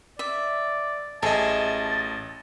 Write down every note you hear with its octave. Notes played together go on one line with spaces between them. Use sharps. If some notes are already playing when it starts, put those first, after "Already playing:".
D5 E5
A1 G#4 A4 D#5 E5 A5